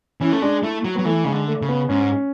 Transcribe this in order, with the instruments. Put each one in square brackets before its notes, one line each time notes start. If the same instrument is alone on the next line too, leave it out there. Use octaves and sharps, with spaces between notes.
[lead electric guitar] E3 [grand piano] C#4
[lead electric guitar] A3
[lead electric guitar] G#3 [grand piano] D4
[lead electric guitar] A3 [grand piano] E4
[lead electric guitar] F#3
[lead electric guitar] F#3 [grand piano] B3
[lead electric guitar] E3 [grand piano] A3
[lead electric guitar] C#3 [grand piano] G#3
[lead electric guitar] D3
[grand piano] A3
[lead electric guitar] C#3
[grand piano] B3
[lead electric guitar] G#2 [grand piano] C#4